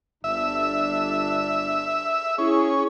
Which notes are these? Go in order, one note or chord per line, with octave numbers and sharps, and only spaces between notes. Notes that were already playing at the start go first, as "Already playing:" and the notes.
G1 D4 E5
C#4 E4 G#4